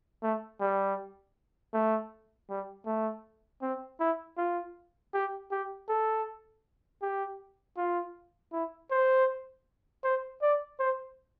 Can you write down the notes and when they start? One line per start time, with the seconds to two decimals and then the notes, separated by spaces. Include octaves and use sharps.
0.23 A3
0.60 G3
1.73 A3
2.49 G3
2.86 A3
3.62 C4
4.00 E4
4.37 F4
5.14 G4
5.51 G4
5.89 A4
7.02 G4
7.77 F4
8.53 E4
8.91 C5
10.04 C5
10.42 D5
10.79 C5